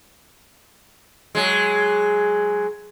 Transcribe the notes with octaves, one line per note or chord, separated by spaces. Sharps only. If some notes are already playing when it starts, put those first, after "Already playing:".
F#3 G#3